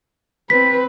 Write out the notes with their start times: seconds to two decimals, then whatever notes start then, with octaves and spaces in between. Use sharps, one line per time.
0.50 C4 B4 B6